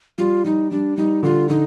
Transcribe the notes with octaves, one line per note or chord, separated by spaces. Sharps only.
G3 F4
G3 D#4
G3 D4
G3 D#4
D3 F4
D3 D#4